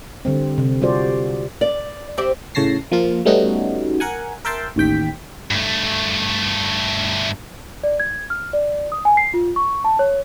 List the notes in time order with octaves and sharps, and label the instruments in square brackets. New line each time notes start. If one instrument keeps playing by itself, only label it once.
[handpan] D3 G3 C4
C3
G3 F4 F#4 G#4 C5 D5
[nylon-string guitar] D5
[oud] C4 G4 D5
[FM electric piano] A2 C#3 C#5 A5 A#6 C7
F3 A#3 F4
G3 A3 B3 C#4 D#4 F#4
A#4 F#5 G#5
A#4 E5 G5 A5 C6
A1 D#2 G5 B6
[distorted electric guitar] G2 A3
[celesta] D5
G#6
F6
D5
D#6
G#5
C7
F4
C#6
A5
C#5